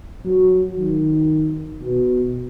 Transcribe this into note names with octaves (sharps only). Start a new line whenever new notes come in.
F#3
D#3
B2